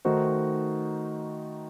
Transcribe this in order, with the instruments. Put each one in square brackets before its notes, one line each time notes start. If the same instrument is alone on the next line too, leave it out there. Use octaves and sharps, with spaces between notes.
[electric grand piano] D#3 A3 D#4 F#4 C5